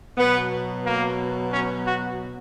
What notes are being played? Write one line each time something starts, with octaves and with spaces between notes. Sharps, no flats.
B2 F#3 B3
A#3
C#4
F#4